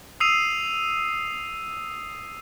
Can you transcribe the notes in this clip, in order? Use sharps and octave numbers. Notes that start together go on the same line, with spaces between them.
D#6 E6 C7 D#7 F7